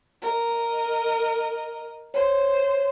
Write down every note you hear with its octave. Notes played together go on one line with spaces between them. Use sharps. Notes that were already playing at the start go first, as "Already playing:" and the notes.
A#4 D#5
C5 C#5